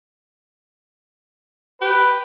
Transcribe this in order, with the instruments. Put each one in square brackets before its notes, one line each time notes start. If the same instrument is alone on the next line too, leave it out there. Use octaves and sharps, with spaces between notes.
[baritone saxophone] G4 [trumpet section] B4